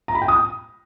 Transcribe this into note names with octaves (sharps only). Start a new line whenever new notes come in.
A#5
B5
G5
D#6